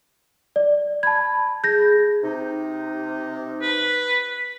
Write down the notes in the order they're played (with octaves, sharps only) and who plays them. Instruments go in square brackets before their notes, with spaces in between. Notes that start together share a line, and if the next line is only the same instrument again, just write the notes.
[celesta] D5
[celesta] A5 G#6 [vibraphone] B5
[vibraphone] G#4 [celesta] G6 A#6
[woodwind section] C3 D#4
[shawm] B4